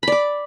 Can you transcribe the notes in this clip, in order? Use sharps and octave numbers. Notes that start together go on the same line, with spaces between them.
D5 B5 D6